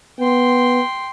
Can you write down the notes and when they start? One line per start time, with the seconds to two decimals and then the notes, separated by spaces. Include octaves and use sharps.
0.19 B3 G5 C6